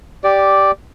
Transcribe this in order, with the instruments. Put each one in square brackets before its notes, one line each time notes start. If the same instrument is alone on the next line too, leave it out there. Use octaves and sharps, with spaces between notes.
[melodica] G4 D5